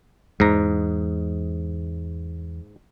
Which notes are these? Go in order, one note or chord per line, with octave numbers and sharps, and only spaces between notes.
E2 G#2 G#3 A#5